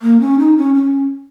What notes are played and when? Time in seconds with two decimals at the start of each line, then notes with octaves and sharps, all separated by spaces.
0.02 A#3
0.21 C#4
0.39 D#4
0.57 C#4
0.74 C#4